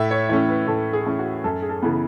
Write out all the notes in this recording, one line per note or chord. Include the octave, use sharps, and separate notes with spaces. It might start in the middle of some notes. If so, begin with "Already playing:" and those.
Already playing: A2 E5
C#5
E3 A3 C#4 C#5
B4
A2 A4
G#4
E3 A3 C#4
F#4
F#2 A4
G#4
A4
C#3 E3 B3